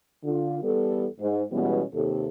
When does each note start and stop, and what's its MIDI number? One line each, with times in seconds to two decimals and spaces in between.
0.24 0.58 50
0.24 0.58 65
0.62 1.06 40
0.62 1.06 55
0.62 1.06 59
0.62 1.06 69
1.19 1.42 44
1.52 1.82 47
1.52 1.82 52
1.52 1.82 55
1.52 1.82 56
1.52 1.82 59
1.52 1.82 61
1.93 2.28 39
1.93 2.28 48
1.93 2.28 69